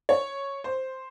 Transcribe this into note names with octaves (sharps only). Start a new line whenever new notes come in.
C#5
C5